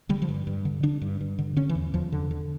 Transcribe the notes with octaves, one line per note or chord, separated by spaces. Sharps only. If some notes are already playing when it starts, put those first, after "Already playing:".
D3 G3
F3
G2
G2
D3
D3 D4
G2
G2
D3
D3 C#4
E3
E2
E2 F3
D3
D3